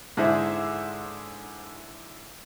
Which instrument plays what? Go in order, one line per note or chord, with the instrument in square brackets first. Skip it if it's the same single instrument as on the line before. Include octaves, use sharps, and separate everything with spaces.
[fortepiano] G#2 D3 E4 G#4 C5 E5